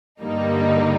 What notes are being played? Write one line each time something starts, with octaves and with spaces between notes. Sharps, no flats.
G2 D3 G3 A#3 D#4